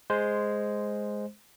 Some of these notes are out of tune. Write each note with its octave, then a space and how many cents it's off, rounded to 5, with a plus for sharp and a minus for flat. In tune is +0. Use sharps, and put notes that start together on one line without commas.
G#3 +0 C5 +0 C6 -10